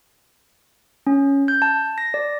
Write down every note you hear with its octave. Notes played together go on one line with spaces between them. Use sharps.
C#4
G6
A5
A#6
D5